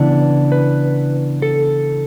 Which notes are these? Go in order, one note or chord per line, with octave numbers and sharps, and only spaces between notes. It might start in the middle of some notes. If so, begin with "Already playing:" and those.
Already playing: C#3 E3 B3 D4
B4
A4